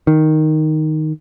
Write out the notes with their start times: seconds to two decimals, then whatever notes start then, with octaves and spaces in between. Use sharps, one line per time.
0.07 D#3